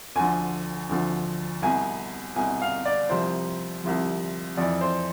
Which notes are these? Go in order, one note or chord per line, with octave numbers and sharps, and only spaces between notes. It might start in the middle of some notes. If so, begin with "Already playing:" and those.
D2 D3 F3 G#5
D2 D3 F3
C2 B2 G#5
C2 B2 G#5
F5
D5
C2 C3 F3 C5
C2 C3 F3
F2 E3 D5
C5